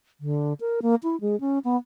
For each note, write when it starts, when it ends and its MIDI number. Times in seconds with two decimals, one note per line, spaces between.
0.20 0.53 50
0.60 0.80 70
0.82 0.95 58
1.03 1.19 64
1.21 1.39 56
1.40 1.59 61
1.64 1.76 59